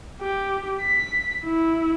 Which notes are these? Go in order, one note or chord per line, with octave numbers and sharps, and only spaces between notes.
G4
B6
E4